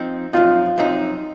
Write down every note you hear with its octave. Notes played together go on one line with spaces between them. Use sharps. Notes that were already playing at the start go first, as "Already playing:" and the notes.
Already playing: F3 C4 D#4
F#2 F3 C4 D#4 F4
F#2 F3 C4 D#4